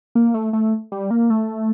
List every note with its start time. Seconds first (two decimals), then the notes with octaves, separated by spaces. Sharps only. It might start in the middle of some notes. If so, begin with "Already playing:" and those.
0.15 A#3
0.34 A3
0.53 A3
0.92 G3
1.11 A#3
1.30 A3